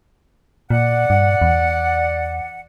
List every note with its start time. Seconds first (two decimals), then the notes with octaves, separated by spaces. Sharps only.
0.70 A#2 D5 F#5
1.10 G2
1.42 E2